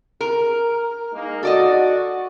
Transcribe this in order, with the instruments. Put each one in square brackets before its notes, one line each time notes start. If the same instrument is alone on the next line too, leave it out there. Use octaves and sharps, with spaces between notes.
[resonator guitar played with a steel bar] A#4
[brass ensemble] G#3 A#3 D#4
[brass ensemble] F#4 [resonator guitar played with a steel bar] A4 D5 D#5